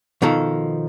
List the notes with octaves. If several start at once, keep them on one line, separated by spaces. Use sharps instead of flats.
B2 D#3 F3 A4